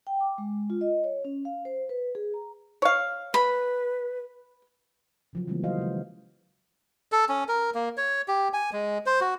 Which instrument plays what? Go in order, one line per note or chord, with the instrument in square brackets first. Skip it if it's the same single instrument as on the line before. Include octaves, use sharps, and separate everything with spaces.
[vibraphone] G5
D6
G#3
F4
D#5
C#5
C#4
F5
C5
B4
G#4
A#5
[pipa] C#5 F5
[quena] B4 [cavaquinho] B5
[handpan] C#3 F3 F#3
C#3 E3 G3 G#3 A#3 B3
D#3 F#3 F#4 C5 D#5 F5
C#3 G#3
[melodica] A4
C#4
A#4
A#3
C#5
G4
G#5
G#3
C5
F#4